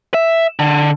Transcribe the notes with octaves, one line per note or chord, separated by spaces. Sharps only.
E5
D3